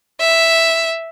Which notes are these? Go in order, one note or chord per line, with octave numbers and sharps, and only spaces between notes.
E5